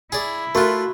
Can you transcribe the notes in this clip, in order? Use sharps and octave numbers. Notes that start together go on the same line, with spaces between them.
E4 G#4 D5
A3 F4 F#4 A#4 C#6 F#6